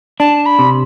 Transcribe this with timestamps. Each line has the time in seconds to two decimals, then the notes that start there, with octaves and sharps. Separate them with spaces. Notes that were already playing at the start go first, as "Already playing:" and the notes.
0.20 D4 A5
0.46 B5
0.59 C3